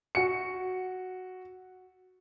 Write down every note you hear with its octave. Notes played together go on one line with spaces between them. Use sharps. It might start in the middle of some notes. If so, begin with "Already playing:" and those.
F#4 C#7